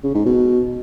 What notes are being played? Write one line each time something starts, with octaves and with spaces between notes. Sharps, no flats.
C#3
G#2
B2